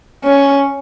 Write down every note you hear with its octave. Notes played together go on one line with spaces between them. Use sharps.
C#4